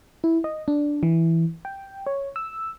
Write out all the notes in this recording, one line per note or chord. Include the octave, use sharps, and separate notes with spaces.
E4
D#5
D4
E3
G5
C#5
E6